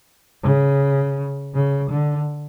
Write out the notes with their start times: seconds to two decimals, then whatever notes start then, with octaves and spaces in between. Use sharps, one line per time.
0.43 C#3
1.55 C#3
1.90 D3